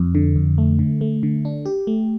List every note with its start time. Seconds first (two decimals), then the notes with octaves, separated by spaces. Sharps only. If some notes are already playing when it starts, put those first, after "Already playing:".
Already playing: F2
0.15 D3
0.36 F2
0.58 A3
0.79 D3
1.01 A3
1.23 D3
1.45 D4
1.66 G4
1.87 A3